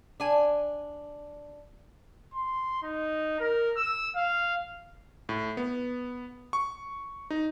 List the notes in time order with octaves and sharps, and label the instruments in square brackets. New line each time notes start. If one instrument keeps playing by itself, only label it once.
[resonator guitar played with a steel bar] D4 G#5
[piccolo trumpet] C6
D#4
A#4
E6
F5
[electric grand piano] A2
B3
C#6
D#4